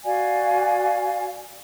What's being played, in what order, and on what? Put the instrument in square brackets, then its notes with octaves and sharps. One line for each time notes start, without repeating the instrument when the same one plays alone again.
[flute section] F#4 D5 F5 G#5